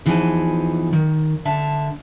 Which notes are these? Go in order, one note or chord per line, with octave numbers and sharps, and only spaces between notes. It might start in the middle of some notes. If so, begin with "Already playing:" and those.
E2 E3 F3 D#4 G#5
D#3
D3 E5 A5